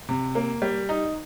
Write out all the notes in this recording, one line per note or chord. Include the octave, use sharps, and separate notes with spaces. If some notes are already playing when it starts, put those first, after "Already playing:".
C3
A#3
G3
D#4